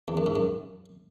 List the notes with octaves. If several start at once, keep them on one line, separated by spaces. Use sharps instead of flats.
E2
F#2
G#2
F#2